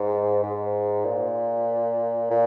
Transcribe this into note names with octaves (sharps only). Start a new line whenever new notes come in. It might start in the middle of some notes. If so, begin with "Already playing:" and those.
Already playing: G#2
G#2
A#2
A#2